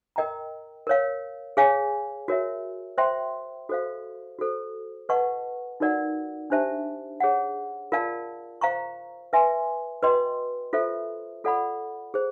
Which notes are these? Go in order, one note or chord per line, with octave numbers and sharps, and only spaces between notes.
A#4 D#5 G5 A#5
A#4 C#5 F5
G#4 C#5 F5 G#5
F#4 A#4 C#5 E5
C5 E5 G5 C6
F#4 A4 C5 F5
F#4 A4 C5
B4 D#5 F#5 A5 C#6
D#4 F#4 A#4 D5 F#5
D4 G4 C5 E5 A5
G#4 C#5 F#5
F4 A#4 D5 F5 A5
C5 F5 A#5 C#6
B4 E5 G#5 C6
F#4 B4 D#5 G5 C6
F4 A4 C5 E5
F4 A4 D5 F#5 B5
G#4 C5